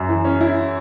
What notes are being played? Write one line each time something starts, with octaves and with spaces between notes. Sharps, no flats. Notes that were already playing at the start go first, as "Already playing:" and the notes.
Already playing: F#2
E3
C#4
E4